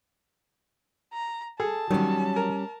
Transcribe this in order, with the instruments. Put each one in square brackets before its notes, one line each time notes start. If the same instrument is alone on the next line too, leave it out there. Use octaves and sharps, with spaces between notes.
[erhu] A#5
[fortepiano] G#4 [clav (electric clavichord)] A4 [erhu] A5
[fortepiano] D#3 [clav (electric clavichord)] F#3 [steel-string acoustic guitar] G3 C#4
[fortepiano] A#4